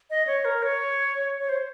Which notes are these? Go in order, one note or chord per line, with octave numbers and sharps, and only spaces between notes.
D#5
C#5
A#4
C#5
C#5
C5